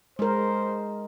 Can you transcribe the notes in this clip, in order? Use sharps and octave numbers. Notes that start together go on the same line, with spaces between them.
G#3 A#4 C5